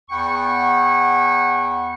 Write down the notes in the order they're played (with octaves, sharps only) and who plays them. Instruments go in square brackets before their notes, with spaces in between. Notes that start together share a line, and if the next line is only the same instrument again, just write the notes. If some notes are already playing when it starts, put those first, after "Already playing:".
[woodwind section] E2 F#5 G5 B5 C#6